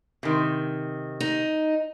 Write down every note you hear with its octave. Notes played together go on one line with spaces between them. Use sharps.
C3 D#3
D#4